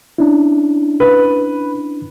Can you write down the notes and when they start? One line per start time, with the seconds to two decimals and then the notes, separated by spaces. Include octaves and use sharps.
0.18 C#4 D4 E4
1.00 B4